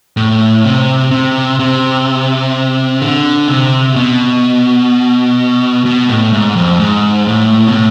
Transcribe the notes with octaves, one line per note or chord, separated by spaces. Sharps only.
A2
C3
C3
C3
D3
C3
B2
B2
A2
G#2
F2
G#2
A2
B2
A2